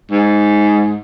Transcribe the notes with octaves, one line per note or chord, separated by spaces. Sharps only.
G#2